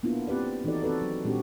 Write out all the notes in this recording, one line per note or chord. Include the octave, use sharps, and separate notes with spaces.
A#3 B3 D4 E4 F4
C4 G4 B4 D5
D#3 E3 D#4 F#4 A4 D5
C4 F#4 A4 B4 D5
F#3
A#2 G#3 C4 D4 F#4 G4